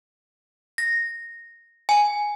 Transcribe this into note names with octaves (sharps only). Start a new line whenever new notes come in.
A#6
G#5